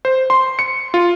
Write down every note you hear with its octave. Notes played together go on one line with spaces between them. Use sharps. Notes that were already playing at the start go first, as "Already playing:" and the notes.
C5
C6
C#7
F4